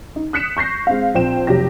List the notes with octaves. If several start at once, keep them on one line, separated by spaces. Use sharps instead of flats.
D#4
D#6 F#6 B6 C#7 E7
C#6 G6 A#6 C7
G#3 C4 F5
A#1 C4 C5 G5 E7
F1 F#3 G4 A#6